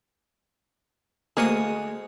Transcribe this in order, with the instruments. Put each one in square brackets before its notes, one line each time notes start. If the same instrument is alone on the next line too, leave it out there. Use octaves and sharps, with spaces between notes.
[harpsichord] D2 C#6 D#6 [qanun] G#3 [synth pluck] A#3 G#4